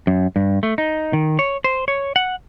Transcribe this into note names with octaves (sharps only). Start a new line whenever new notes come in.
F#2
G2
A3
D#4
D#3
C#5
C5
C#5
F#5